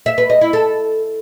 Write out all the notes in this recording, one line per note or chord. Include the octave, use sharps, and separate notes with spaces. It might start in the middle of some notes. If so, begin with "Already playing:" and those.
E5
B4
D#5
E4
A4